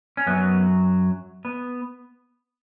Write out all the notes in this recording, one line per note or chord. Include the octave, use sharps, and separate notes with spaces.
C#4
F#2 F#3 B3
B3